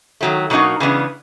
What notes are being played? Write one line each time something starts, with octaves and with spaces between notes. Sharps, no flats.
D#3 F#3 A3
B2 F#3 A#3 D#4 F#4
C#3 E3 G#3 B3 D4